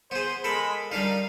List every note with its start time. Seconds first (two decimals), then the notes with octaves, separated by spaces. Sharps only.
0.11 B3 G#4 C5
0.44 G#3 A4 A#4 B5
0.92 G3 D4 D#4 A#4 F5